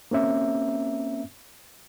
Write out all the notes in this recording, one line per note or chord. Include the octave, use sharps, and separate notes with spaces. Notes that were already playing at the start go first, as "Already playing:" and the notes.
A#3 C4 C#4 E5